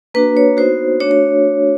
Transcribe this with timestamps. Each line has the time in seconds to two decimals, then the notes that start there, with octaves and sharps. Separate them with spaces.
0.14 A#3 D4 F#4 B4
0.37 C#5
0.57 B3 D#4 F#4 C5
1.00 A3 D4 F#4 C#5
1.11 C#5